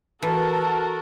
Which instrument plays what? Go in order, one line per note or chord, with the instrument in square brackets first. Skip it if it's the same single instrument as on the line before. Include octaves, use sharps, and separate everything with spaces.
[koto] E3 [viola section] F#4 A4 A#4 [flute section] A5